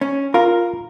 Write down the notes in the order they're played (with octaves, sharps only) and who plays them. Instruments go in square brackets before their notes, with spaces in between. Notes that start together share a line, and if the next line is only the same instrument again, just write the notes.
[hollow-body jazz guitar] C#4
[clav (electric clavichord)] F4 F5 [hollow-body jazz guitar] A#4